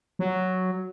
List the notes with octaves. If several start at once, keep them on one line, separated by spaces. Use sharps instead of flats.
F#3